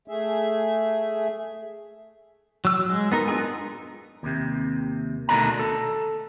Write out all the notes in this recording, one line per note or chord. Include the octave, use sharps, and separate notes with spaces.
A3 G#4 E5
F#3 E6
G#3
B3 D#4 A#4
D4 F4 G#4 G#5
D#2 C3
D2 B2 D#3 A3 D4 A#5
A4